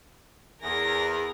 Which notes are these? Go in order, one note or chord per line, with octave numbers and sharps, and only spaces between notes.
E2 G#4 A#4 A#6